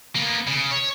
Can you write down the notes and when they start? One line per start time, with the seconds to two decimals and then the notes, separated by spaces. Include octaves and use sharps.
0.16 A#3 B3
0.47 C#3
0.71 C#5